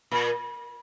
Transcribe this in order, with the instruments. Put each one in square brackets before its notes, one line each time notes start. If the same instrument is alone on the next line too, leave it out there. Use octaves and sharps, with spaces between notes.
[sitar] A#2